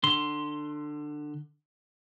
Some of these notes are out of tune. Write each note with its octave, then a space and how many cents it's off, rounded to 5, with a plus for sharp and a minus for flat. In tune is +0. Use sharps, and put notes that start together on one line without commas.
D3 +20 C6 +0